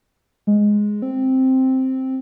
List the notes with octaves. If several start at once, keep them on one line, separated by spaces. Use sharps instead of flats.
G#3
C4